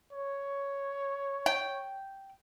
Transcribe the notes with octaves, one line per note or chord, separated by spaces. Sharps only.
C#5
G5